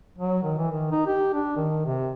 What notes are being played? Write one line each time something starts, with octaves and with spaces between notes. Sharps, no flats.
F#3
D#3
E3
D#3
D#4
G4
D4
D#3
C3